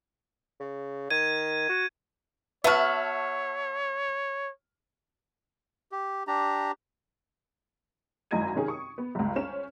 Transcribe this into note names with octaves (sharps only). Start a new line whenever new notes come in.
C#3
D#3 G#6 D#7
F#4
B3 F#4 C#5 E5 A5 F6
G4
D4 G4 A#5
G#1 F#2 E4 D#5 G#6 D#7
C3 D#3 C#4 G#4
C#6 D#6
B3
G1 C#2
C#4 C5 E7